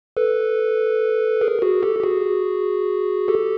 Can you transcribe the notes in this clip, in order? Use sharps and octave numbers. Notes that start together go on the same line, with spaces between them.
A4 B4
G#4 A#4
F#4 G#4
G4 A4
G4
F#4 G#4
G4 A4